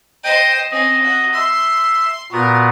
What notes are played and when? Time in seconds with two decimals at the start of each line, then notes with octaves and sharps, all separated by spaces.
0.24 C5 D#5 G5
0.71 C4 C#4 D#5
1.02 F#4
1.34 E5 C6
2.32 A#2 B3 F#4 A#4